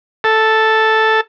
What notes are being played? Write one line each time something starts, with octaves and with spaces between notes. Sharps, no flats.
A4